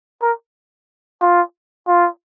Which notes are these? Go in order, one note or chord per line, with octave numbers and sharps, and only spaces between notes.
A#4
F4
F4